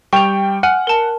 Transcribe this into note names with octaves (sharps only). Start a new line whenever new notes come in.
G3 G5 C#6 F7
F#5 G#5 F6
A#4 A5